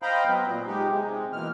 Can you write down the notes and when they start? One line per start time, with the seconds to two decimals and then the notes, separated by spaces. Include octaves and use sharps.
0.02 C5 D#5 F5 G5 A#5 B5
0.26 F#3 B3 C4
0.45 A#2
0.67 G#3 D#4 G4
0.88 C3 G#3
1.33 B2 E3 A#3 F6